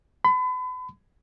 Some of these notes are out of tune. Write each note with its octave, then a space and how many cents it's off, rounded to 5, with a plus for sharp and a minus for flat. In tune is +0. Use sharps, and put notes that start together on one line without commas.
B5 +35